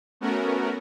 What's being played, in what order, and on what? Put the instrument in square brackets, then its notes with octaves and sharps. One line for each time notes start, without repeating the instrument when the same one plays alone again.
[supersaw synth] A3 B3 C#4 F#4 A#4